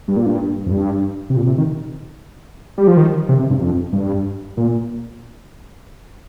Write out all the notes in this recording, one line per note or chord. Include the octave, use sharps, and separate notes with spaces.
G2
A#2
G2
F2
G2
C3
A#2
C3
D#3
G3
F3
D#3
C3
C3
G2
F2
G2
A#2